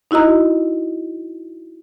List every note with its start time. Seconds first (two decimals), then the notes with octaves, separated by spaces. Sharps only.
0.11 D#4 E4 F#4 D#5 A#5